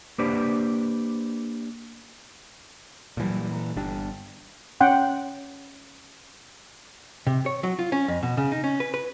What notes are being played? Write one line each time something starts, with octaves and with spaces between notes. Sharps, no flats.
A#3 D4 G4 B4 C5 D5
A#2 E3 F#3 G3 A4
A4 A#5
G1 G3 D4
C#4 F#5 G5 C6
C3
C#5
F#3
F4
C#4
F2
B2
C#3
D#4
C#4
B4
B4